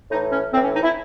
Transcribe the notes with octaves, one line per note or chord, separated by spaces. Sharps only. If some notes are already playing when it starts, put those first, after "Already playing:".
A2 E3 D#4
C#4
A2 E3 C4
C#4
D#4
E4